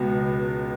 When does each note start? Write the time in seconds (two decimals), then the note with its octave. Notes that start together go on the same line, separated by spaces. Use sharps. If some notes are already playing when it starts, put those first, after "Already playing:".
Already playing: C#2 B2 B3